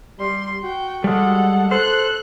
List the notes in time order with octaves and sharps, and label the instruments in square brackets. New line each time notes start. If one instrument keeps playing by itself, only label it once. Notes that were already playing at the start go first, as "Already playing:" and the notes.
[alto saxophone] G3 [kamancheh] C6
[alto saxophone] F#4 [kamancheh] G5
[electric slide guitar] G3 G#3 [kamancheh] A4 F#5
[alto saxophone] A4 [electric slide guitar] C5 [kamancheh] F#6